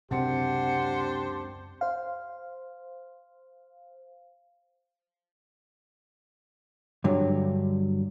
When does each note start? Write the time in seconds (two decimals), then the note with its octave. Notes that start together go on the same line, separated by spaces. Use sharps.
0.11 C#2 F#2 C3 C4 D4 G4 C5 F#5
1.81 C5 F5
7.04 G2 D3 F#3